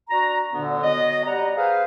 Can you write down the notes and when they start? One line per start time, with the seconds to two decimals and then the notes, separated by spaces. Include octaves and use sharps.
0.10 D4 F#4 A#5
0.53 D2 A#2 D3 B3 D4
0.83 F#3 B3 D#5
1.27 G3 F#5 A#5
1.56 G#4 B4 C5 F5